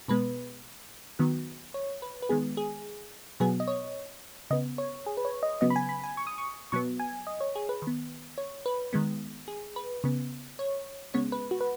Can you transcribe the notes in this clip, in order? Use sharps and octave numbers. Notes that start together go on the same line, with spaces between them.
B2 G#3 B3 B4
D#3 F#3 B3
C#5
B4
B4
D#3 G#3 B3 G#4
G#4
B2 F#3 B3 G#4
D#5
C#5
C#3 B3 D#5
C#5
G#4
B4
C#5
D#5
C#3 F#3 B3 D#5
B5
G#5
B5
G#5
C#6
D#6
C#6
B2 F#3 B3 C#6
G#5
D#5
C#5
G#4
B4
D#3
B3
C#5
B4
D#3 G#3 B3
G#4
B4
C#3 B3
C#5
C#3 G#3 B3 C#5
B4
F#4
B4